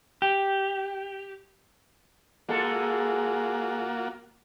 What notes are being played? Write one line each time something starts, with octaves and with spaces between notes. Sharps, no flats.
G4
G#3 A#3 F4 F#4 A4